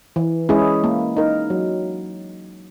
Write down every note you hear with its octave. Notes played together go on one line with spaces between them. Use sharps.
E3
G#3 C#4 E4 G#4
A#3
D#4 A#4
F#3